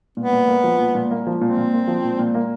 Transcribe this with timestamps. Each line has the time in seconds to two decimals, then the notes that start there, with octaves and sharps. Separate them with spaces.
0.17 A#2 B3
0.33 A#2
0.48 A#3
0.64 F3
0.79 A#2
0.95 A#2
1.11 A#3
1.27 F3
1.41 A#2 C4
1.57 A#2
1.73 A#3
1.88 F3
2.04 A#2
2.19 A#2
2.34 A#3